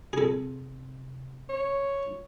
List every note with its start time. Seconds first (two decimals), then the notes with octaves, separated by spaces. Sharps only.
0.13 C3 G#4 A4
1.49 C#5